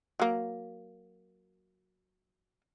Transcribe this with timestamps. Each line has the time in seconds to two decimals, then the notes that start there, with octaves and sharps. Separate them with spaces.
0.20 F#3 A#3